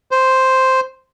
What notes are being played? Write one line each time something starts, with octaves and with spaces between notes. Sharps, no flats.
C5